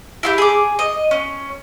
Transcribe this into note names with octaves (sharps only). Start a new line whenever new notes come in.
E4 F4 G4
G#4 D6
D#5
C#4